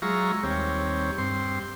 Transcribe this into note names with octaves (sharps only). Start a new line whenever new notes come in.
F#3 G#3 F4 E5 A#5 C#6
D#2 G3 C4 C#5
G2 C4 C6